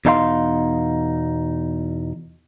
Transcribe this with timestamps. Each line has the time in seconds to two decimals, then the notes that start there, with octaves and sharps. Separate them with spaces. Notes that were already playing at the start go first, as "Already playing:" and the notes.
0.05 E2 B2 D#4 A4 F5 C6